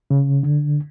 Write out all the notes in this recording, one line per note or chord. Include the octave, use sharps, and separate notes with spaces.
C#3
D3